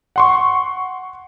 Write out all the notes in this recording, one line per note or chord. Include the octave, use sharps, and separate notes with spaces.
F#5 C6 C#6